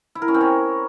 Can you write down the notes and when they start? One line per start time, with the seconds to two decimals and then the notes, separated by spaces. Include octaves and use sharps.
0.15 E4
0.22 A#4
0.28 C#4
0.34 C4
0.41 C#5